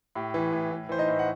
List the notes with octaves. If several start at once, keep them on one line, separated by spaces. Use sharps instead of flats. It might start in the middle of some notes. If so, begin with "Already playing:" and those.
A2 G4
E3
A2
A2
E3 C5
D#4 D#5
A2
F#5